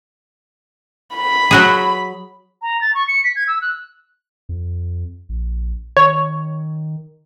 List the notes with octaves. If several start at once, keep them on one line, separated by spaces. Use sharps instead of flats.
B5
F#3 F#4 G#4
A#5
A6
C#6
C#7
B6
G#6
E6
F#6
F2
A#1
D#3 C#5